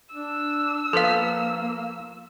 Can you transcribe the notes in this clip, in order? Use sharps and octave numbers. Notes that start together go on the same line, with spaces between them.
D4 E6
F3 A#3 B3 A4 B4 F5